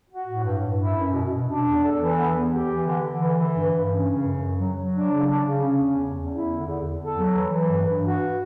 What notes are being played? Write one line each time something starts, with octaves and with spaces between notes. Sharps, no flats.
F#4
A2
G2
G2
E4
F#2
B2
B2
D4
E2
A4
E3
B3
E2
G4
E3
D3
D3
E3
E3
G2
G2
C#4
C#3
F#2
F#2
F#3
F#3
D4
C#3
D4
C#3
C#4
E2
E2
E2
E4
D3
E2
E2
A4
F#3
E3
E3
G2
G2
F#4